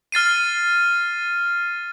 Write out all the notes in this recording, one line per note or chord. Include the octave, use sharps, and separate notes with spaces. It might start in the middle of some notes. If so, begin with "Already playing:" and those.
F6 A6 C7 D#7